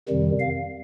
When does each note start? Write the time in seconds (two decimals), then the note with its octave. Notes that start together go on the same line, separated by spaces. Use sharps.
0.08 F2 C3 D#3 G3
0.40 F5